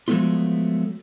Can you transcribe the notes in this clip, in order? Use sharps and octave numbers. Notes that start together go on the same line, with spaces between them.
F3 F#3 G#3 A3 B3 F4